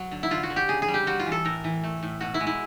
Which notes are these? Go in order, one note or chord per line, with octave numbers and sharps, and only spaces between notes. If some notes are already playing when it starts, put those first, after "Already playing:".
Already playing: F#3
D3
E4
D3 F4
F#4
D3
G4
C#3 G#4
G#4
G3
G4
G3 F#4
F4
E3
A4
A2 A#4
E3
A3
A2
B2 F#4
E4
G#3
E4